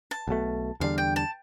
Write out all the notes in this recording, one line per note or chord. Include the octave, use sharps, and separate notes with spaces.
A5
B1 B2 A3
E2 D3 G3 D4 F5
G5
A5